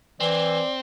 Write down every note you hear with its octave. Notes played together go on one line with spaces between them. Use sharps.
E3 C4 D5